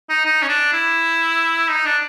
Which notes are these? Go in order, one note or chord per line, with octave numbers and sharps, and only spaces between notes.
D#4
D#4
C#4
D4
E4
D#4
D4